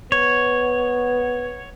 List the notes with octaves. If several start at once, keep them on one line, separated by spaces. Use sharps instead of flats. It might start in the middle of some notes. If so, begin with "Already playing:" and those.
B3 C#5